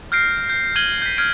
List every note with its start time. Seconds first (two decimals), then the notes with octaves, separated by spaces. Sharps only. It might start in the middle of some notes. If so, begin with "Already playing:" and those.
0.12 F6 G6 A#6 C7 D7
0.49 G6
0.76 F6 G#6 D#7 F#7 G7
1.02 G6 B6
1.18 F6 G#6 D7 D#7